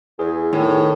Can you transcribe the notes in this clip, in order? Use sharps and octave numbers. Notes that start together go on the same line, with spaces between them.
E2 G#4
A2 D#3